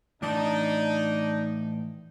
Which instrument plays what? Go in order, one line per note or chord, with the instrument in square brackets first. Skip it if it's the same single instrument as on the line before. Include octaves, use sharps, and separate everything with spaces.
[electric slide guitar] A2 E3 A5 [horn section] D4 D#4